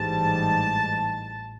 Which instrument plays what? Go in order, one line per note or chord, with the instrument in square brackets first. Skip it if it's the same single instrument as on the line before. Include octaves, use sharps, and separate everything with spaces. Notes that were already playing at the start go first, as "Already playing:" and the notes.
Already playing: [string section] A1 G#2 E3 G3 A5